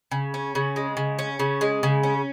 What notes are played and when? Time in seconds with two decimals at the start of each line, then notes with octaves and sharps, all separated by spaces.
0.11 C#3
0.34 C#4
0.55 C#3
0.76 G#3
0.97 C#3
1.19 C#4
1.39 C#3
1.61 G#3
1.83 C#3
2.03 C#4